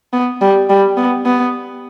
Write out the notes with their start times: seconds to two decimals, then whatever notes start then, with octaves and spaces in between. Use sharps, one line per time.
0.13 B3
0.41 G3
0.70 G3
0.97 B3
1.26 B3